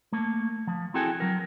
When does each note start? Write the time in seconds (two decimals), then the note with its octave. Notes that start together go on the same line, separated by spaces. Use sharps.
0.12 A3 A#3
0.67 F3
0.94 C4 E4 F#4 G#4 A4 G5
1.20 F#3 A#4